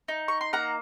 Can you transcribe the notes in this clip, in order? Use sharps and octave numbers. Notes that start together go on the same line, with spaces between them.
D#4
C#6
C6
A#3 F#5 A#5